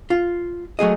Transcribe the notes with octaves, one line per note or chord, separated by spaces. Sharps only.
F4
F#3 A3 G#4 D#5